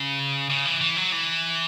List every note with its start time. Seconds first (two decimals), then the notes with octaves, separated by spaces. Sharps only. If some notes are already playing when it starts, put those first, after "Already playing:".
Already playing: C#3
0.50 C#3
0.65 E3
0.81 E3
0.97 F#3
1.12 E3